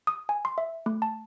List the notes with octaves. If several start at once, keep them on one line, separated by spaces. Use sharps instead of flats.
D#6
G#5
C6
E5
A3
A5